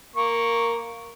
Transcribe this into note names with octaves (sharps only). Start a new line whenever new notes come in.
A#3 C#6